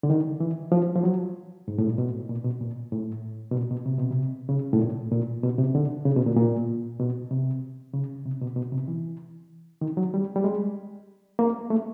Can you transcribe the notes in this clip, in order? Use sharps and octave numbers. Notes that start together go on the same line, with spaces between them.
D3
D#3
E3
F3
F3
F#3
G#2
A2
A#2
B2
A#2
B2
A#2
A2
B2
A#2
B2
C3
B2
C3
C#3
A2
A#2
A#2
B2
C3
D3
C#3
B2
A#2
A#2
B2
C3
C#3
C3
B2
B2
C3
E3
D#3
F#3
G3
G3
G#3
A#3
A3